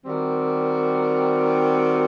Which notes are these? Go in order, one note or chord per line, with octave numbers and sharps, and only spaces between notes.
D#3 G3 C4 F#4 A#4